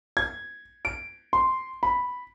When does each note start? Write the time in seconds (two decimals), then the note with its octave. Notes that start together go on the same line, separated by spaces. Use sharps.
0.17 G#6
0.85 D7
1.33 C6
1.83 B5